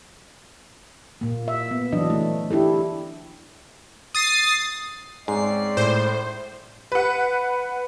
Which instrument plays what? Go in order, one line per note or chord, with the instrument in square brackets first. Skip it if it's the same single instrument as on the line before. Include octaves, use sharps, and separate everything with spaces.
[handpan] A#2 A#3
E5
B3
E3 F#3 D4 D#5
A3
D4 E4 G4 A4
[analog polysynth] D#6 A6 C7
[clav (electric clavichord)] G#2 [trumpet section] C4 C#4 D5 [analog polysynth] C7
[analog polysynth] A2 [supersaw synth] C5
[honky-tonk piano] B4 F#5